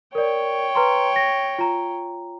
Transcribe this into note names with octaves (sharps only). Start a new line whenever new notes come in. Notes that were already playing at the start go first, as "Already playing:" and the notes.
A#4 C#5 D5 G5
B4 A#5 C6
A#6
F4 A#5